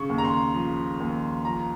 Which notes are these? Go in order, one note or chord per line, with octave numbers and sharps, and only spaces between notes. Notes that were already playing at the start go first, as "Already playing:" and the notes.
Already playing: C#3 C#6
D#2
A#5
C6
F3
D#2
F3 A#5